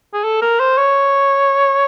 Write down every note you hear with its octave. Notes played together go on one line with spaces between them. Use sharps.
G#4
A4
A#4
C5
C#5